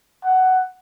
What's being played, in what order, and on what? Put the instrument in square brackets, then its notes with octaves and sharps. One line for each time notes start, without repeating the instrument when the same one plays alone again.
[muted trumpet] F#5